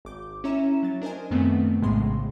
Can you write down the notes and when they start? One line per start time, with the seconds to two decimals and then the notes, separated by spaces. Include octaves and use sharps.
0.05 G#1 D6 G6
0.44 C#4 E4 C#5 E5 A#5 E7
0.83 F#3 A6
1.02 D4 A#4 C5 D#5 G#5
1.31 F#2 A#2 D#3 A3 B3 C4
1.82 A#1 A2 C#3 G#3 C6